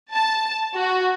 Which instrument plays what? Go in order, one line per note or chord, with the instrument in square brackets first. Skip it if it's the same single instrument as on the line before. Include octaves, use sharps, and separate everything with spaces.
[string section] A5
F#4